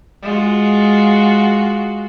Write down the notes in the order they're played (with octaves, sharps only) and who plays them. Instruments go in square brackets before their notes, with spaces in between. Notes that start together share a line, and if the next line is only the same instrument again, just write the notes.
[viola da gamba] G#3 F4 F#4